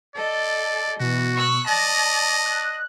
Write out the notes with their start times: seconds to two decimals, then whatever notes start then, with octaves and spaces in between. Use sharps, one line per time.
0.15 A4 D5 D#5
1.00 B2 E3 F#4
1.35 C#6 E6 F#6
1.68 D5 D#5 A5 A#6
2.46 F#6